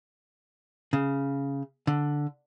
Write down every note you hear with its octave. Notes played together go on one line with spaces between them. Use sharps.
C#3
D3